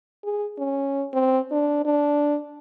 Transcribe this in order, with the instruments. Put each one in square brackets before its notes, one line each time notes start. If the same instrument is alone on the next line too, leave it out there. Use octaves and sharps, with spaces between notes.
[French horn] G#4
C#4
C4
D4
D4